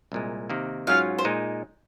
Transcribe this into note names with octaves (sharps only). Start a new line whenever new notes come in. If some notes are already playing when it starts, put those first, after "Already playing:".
C2 A#2 G#3
C3 D#3 A#3
G#2 F#3 C#4 F4 F5
C5
A#2 G#3 D#4